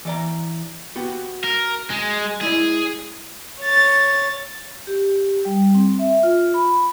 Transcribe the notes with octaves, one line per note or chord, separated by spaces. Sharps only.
E3 D5 A#5
B3 F#4 G4
A#4
G#3
G#3 E4 G#4 D5
C#5 A6
G4
G3
C4
E5
F4
B5